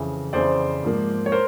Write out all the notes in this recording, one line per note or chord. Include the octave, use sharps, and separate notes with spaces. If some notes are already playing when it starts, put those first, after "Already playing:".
Already playing: F2 C#3 E3
F2 C#3 E3 C5 D5
G#2 F3 A#3
C#5
A#4 C5